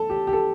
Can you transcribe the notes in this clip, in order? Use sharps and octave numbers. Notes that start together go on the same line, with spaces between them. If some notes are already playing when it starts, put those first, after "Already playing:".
Already playing: A4
G4
G4
A4